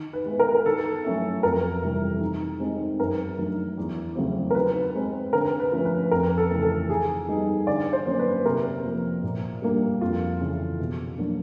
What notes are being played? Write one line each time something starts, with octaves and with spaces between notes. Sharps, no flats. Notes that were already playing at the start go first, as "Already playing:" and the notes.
Already playing: D#3
B4
G#3 B3 E4
A#4
A#4
D#3 A4
F#3 A3 C#4 E4
F2 A#4
C3 E3 G3
D#3
G#3 C4 D#4
F#2 A#4
D#3 F#3 A3 D4
E2
C#3 F#3 A3 C4
A#4
D#3 B4
G#3 C4
D3 A#4
B4
F3 A3 C#4
B4
F2 A#4
A4
C#3 E3 A3
A4
D#3 G#4
G3 B3 D#4
D3 D5
C5
F#3 A#3 C#4
B4
C3 A#4
F3 A#3
A#2
G3 A#3 D4
F2 F4
C#3 E3
B2
F#3 A#3 D4